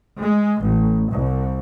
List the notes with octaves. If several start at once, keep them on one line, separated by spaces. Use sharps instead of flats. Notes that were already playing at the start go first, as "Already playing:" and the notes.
G#3
A1
C2